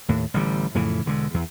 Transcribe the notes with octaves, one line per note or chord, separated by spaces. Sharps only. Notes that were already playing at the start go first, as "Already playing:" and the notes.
D#2 A2
A1 D3 F#3 G3
F2 A2 C#3 E3
E1 D3 G#3
E2